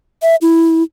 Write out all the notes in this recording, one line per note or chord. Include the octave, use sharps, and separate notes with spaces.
E5
E4